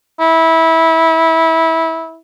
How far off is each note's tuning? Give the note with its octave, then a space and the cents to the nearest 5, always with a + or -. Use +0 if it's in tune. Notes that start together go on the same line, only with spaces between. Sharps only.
E4 -20